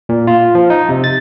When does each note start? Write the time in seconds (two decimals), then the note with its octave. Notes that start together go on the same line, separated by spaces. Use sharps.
0.09 A#2
0.27 F4
0.55 F3
0.70 D#4
0.89 C3
1.04 A6